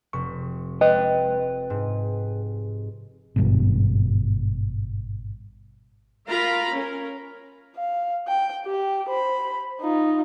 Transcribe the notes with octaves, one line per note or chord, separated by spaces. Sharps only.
F1 C#6
B4 D#5 G5
G#2
G#1 G2 B2
F4 A#4 F5 A#5 B5
C#4 A#4
F5
G5
G4
C5 B5
D#4 F4